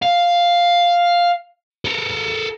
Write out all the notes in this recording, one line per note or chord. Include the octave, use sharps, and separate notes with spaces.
F5
A4 A#4